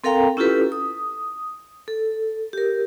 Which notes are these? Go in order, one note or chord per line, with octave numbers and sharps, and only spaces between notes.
C4 A4 A#4 F5 G5 A#5
C#4 E4 F4 G4 A4 B4
D#6
A4
G4 A#4